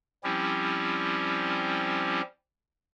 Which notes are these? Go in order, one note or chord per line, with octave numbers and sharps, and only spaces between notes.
F3 G3 C4 C#4 E4 G4